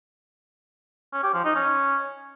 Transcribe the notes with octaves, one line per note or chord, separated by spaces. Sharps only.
C#4
G4
F3
D#4
C#4